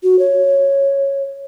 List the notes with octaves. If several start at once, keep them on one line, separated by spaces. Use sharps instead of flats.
F#4
C#5